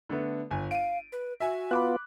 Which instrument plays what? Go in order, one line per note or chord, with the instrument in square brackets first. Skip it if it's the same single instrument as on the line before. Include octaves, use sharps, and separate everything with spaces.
[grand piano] D3 A3 B3
G1 G#5
[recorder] F5 [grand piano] D7 D#7
[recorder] B4
[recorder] F#4 [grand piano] E5 G#5
[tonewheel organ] B3 F4 [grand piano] B5 D6 F#6